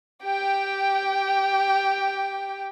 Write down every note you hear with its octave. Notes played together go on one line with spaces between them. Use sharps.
G4 G5